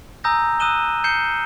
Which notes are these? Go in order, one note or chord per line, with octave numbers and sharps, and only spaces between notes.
G#5 A#5 D#6 E6 G6 A#6
D#6 E6 F#6 D#7 E7 G7
G6 C7 C#7 E7 G7